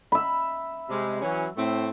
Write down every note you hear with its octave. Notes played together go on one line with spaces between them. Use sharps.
E5 B5
C3 G3 G#3
E3 F#3 C#4
A2 A3 C4